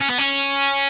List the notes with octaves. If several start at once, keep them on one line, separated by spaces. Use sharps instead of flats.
C#4
B3
C#4